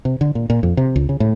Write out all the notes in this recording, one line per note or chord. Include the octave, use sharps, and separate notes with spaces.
C3
D3
A#2
A#2
F2
C3
C#2
C#3
A2